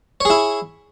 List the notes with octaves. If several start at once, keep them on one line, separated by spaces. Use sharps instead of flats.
E4 G#4 C#5